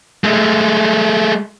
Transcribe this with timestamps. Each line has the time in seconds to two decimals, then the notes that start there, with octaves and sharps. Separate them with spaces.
0.24 G#3 A3